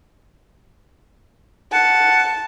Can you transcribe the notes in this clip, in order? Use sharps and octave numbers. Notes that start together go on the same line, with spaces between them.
F#5 A5